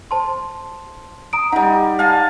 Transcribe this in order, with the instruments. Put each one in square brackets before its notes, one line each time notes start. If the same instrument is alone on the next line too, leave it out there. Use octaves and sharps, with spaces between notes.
[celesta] C5 A5 C6
A#5 D#6 D7
[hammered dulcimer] G3 D#4 [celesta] F#5
[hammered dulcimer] F5 G#5 A5